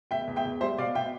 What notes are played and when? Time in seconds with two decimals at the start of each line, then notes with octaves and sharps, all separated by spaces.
0.11 E2 E5 G5
0.27 E2
0.36 E5 G5
0.45 E2
0.61 G3 C5 E5
0.78 B2 D5 F5
0.95 B2 E5 G5